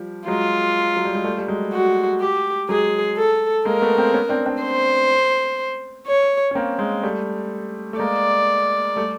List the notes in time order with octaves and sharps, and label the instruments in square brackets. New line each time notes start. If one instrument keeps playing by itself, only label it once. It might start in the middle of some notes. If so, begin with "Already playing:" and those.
Already playing: [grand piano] F3 G3
[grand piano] F#3 G#3 [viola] F4
[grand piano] F#3
G3
G#3
G3 A3
G3
F#3 G#3
[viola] F#4
G4
[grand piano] F#3 G#3 [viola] G#4
[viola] A4
[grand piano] G#3 A#3 [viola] A#4
[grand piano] A3 B3
A#3 C4
B3 C#4
C4 D4
C4 D4
[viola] C5
C#5
[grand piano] C#4
A#3 C4
G#3 A#3
G3 A3
A3
[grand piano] G#3 A#3 [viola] D5
[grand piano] G3 A3